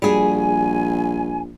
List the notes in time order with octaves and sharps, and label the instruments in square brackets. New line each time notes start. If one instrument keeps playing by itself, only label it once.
[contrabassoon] A#1 [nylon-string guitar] G3 F#4 G#4 [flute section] G#5